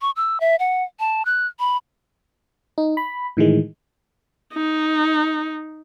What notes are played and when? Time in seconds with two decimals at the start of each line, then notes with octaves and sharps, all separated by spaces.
0.02 C#6
0.16 E6
0.40 E5
0.59 F#5
1.00 A5
1.25 F#6
1.59 B5
2.78 D#4
2.97 B5
3.37 A2 D#3 E3 G#3
4.54 D#4